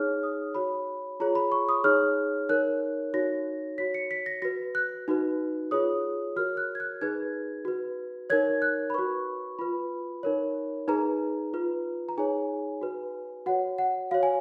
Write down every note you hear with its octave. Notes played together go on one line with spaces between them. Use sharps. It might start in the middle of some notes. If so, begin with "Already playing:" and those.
Already playing: D#4 G#4 C#5 F6
D#6
F#4 C#5 B5
F4 G#4 C#5 A#5
B5
C#6
D#6
D#4 G#4 C#5 F6
D#4 A#4 C#5 F#6
D#4 F#4 C#5 A#6
F#4 C#5 B6
C#7
B6
A#6
F#4 B4 A#6
F#6
D#4 F#4 B4
F4 G#4 C#5 D#6
F#4 A#4 C#5 F6
F#6
G#6
F#6
D#4 G#4 B4 G#6
F#4 B4
D#4 A#4 C#5 G#6
F#6
B5
F#4 B4 C#6
F4 B4 B5
D#4 A#4 C#5
D#4 G#4 B4 A#5
F4 B4
A#5
D#4 G#4 C#5 G#5
F#4 B4
F#4 C#5 F#5
F#5
F#4 C#5 F5
G#5